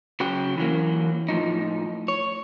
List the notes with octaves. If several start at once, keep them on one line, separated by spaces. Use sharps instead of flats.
C#3 F#3 F#4 G5
E3 F#3 A#3
A2 F3 D#4
C#5